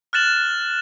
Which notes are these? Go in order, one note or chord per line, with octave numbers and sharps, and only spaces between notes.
F6 F#6 A6 E7 F#7